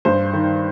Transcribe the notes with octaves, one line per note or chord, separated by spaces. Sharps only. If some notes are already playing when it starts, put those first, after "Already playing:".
G2 C5
D#3